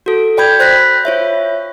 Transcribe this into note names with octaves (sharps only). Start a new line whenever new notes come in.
F#4 A4
D5 G5 B5 G6 G#6
C5 F#6 A#6 B6
F4 C#5 E5